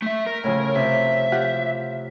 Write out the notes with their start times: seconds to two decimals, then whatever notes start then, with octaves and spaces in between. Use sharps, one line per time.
0.02 A3 E5
0.26 A#4
0.44 A2 C#3 F3
0.76 C3 E5
1.32 F4 G4 F#5